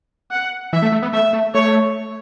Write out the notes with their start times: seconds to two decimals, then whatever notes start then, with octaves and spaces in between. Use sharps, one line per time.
0.32 F#5
0.73 E3 E5
0.82 A3
0.92 A3
1.02 B3
1.13 A3 E5
1.33 A3
1.55 A3 C#5